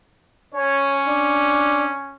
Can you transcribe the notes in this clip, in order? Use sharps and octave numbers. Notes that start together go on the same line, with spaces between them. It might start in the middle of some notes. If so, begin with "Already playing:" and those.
C#4 C#5
D4